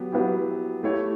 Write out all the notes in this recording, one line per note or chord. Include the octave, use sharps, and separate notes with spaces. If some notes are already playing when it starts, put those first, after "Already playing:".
Already playing: F#3 B3 G4
F#3 B3 E4 G4
A3 E4 G4 C#5